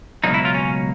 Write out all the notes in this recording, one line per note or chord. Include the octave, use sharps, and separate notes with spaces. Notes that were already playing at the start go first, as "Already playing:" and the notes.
C#2 B2 F#3 A#3 D#4
E4
F4
C#4